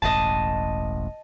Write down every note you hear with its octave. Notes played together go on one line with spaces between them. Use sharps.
E1 A1 D#5 A5